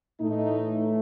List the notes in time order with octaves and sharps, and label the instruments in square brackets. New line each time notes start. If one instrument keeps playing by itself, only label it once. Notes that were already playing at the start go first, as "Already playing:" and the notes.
[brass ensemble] A2 E3 A3 D#4